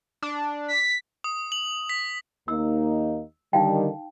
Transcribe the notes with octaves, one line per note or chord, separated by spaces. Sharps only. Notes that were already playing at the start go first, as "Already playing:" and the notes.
D4
B6
D#6
F#7
B6
D#2 A#3 D#4 E6
D3 D#3 G3 D#4 F5 G5